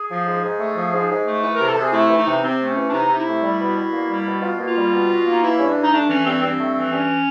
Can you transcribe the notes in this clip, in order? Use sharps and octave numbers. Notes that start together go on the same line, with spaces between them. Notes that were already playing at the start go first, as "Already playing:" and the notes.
Already playing: G#4
F3
G#2
G#2
A3
F3
G#2
G#2
A3
E3 B4
C3 A#4
A4
C3
G#4
A3 E4
E3
D#4
C3
C3 C4
A3
C#4
E3
D4
C3 D#4
C3
E4
A3
G3
B2
B2
A#3
G3
B2
B2 F4
A#3
F4
G3
B2
B2
A#3
D#4
E3 E4
G2 C#4
D4
G2
D#4
A3 D4
E3 C#4
G2 C4
G2 C4
A3
E3
G2 C#4